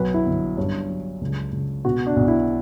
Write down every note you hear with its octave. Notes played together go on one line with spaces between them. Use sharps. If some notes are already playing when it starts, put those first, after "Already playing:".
Already playing: B1 F#3 B4
E4
G1
G2 C#4
F#3
C#2
C#2
B2 F#4
D4
B1
E4